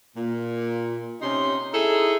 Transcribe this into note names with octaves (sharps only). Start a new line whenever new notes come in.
A#2
C3 C#4 D#4 C6
D#4 E4 G#4 A4